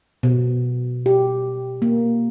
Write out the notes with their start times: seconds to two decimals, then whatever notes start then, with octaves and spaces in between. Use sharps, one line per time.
0.23 B2
1.06 G4
1.82 A#3